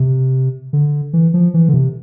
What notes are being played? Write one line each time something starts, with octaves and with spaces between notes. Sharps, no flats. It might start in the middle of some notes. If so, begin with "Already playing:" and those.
Already playing: C3
D3
E3
F3
E3
D3
C3